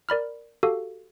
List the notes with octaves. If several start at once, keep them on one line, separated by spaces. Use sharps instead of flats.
A#4 D5 B5 F6
F#4 G4 A4 F5